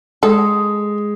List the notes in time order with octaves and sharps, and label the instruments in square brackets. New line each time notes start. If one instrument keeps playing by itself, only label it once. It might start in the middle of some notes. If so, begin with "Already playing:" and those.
[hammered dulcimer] G#3 [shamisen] A4